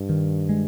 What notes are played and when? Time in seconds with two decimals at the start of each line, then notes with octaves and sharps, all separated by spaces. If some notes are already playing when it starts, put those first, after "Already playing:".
Already playing: G2
0.09 D#3
0.49 G#3